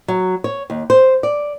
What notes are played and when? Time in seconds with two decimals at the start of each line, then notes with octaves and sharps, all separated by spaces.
0.08 F#3
0.44 C#5
0.70 D#2
0.90 C5
1.23 D5